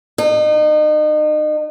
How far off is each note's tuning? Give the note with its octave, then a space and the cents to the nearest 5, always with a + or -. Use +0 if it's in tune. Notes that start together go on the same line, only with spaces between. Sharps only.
D#4 -35